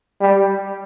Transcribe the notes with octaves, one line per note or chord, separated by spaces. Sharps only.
G3